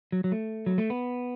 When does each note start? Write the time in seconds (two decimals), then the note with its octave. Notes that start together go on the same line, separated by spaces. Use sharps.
0.12 F#3
0.24 F#3
0.32 A3
0.66 F#3
0.78 A3
0.90 B3